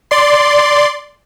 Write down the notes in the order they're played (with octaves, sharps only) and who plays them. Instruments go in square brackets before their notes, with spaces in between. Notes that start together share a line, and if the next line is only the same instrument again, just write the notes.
[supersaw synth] D5 C6